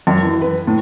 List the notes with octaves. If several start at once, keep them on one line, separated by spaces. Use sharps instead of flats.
F#2
E3
B4
A2